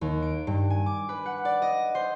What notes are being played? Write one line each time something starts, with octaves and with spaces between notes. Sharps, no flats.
D#2
D7
G2
G#5
D6
B4
F#5
D5
D#5
C5